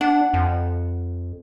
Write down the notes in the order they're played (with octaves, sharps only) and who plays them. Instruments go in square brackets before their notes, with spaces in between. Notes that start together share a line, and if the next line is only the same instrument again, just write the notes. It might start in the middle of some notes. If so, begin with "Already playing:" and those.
[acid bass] D4 [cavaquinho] F#5
[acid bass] F2